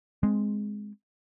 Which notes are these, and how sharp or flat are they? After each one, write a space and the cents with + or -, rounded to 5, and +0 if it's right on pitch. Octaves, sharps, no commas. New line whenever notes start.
G#3 +0 C4 +0